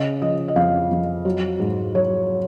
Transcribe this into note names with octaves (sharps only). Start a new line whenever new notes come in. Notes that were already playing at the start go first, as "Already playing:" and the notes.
Already playing: C#3 D#5
F3 D#5
D#5
F2 F5
F2
F#3
G#2
F#3 C#5